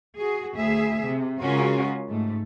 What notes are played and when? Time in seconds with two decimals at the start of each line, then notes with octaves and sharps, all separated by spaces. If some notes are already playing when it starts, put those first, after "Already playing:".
0.17 F#4 G#4
0.54 D2 G#4 E5
1.06 C3
1.41 C#3 G#3 C#4 F4 F#4 A#4
2.08 G#2 A3